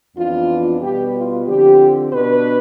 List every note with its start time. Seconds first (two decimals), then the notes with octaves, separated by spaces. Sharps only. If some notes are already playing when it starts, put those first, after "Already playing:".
0.16 F2 E3 B3 D4 F4
0.81 B2 G3 B3 G4
1.15 F4
1.46 D3 F3 C4 G4
2.11 B2 B3 D4 B4